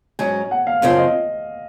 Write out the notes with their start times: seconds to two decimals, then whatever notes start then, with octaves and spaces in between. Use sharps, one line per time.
0.19 G#2 F#3 C#4 G#5
0.51 F#5
0.67 F5
0.82 F#2 C#3 F3 C4 F5
0.98 D#5